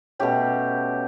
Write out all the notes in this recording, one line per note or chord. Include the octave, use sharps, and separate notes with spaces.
B2 A3 C#4 G4